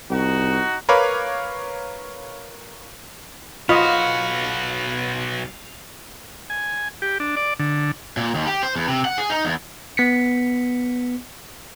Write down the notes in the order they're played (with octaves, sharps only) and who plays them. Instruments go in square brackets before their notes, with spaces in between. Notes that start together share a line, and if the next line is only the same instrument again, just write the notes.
[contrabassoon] C2 [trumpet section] D#4 F#4
[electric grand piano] A#4 B4 C#5 F5 B5 D6
[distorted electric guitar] B1 F#4 [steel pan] F4 D#5 [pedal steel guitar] F5 [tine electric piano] B5 C#6 F6
[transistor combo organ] G#5
G4
D4
D5
D3
[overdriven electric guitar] A#2
D#2
G4
C5
E2
C3
F#5
G#4
D#4
E2
[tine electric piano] B3 B6 C#7